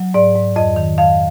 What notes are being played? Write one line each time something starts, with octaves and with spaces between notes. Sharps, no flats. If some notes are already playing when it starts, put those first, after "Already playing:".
Already playing: F#3
G#2 D5
G#2
F2 D#5
D#3
F2 F5